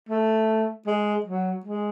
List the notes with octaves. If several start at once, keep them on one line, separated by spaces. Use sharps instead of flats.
A3
G#3
F#3
G#3